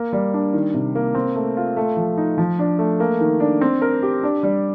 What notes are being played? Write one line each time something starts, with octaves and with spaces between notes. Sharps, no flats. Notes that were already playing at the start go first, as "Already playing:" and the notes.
Already playing: A#3
G3
D4
D#3
C3
A#3
C4
A3
F4
A3
F3
D#4
F3
D4
A3
A#3
D#3
D4
C4
A#4
G4
D4
G3